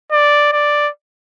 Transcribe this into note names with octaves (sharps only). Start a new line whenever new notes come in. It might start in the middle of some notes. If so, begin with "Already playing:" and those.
D5
D5